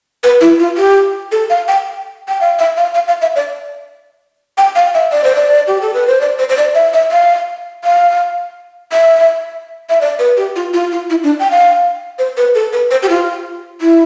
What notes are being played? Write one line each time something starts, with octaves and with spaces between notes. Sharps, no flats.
B4
E4
F4
G4
A4
F5
G5
G5
F5
E5
F5
F5
F5
E5
D5
G5
F5
E5
D5
C5
D5
G4
A4
B4
C5
D5
C5
C5
D5
E5
E5
F5
F5
E5
E5
D5
B4
G4
F4
F4
F4
E4
D4
G5
F5
C5
B4
A4
B4
C5
G4
F4
E4